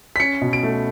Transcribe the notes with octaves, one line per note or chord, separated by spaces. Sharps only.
B6
C#4 C#7
B2
D7
A3